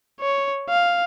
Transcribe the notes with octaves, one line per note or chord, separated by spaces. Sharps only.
C#5
F5